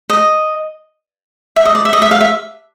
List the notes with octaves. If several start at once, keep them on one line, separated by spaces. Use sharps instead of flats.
D#5
E5
D#5
D5
E5
D#5
E5
F5
E5